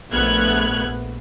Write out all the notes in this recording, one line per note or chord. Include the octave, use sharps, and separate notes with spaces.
A#1 A3 B3 F6 F#6 G#6